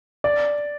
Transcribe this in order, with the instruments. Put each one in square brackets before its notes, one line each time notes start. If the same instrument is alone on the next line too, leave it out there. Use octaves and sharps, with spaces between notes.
[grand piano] D5